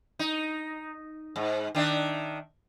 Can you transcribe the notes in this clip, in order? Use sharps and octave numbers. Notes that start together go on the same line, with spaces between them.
D#4
G#2
D#3 D4 E5